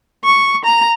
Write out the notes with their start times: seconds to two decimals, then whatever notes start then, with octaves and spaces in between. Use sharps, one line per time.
0.24 C#6
0.65 A#5